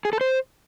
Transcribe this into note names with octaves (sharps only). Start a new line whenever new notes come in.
G#4
A4
C5